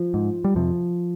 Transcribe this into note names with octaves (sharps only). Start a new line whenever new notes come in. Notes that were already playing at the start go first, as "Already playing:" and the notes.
Already playing: F3
G#2
G3
F2 C3 F3